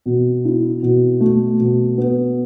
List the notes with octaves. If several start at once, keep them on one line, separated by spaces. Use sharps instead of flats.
B2
E4
B2
A3
B2
B3